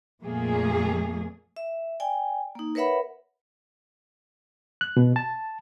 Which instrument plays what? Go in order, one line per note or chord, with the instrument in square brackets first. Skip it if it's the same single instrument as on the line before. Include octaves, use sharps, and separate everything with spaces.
[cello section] F2 A#2 A3 A#3 G#4
[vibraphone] E5
D5 G5 G#5
A#3 D#4
A#4 B4 C#5 E5 F#5 B5
[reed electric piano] F#6
B2
A5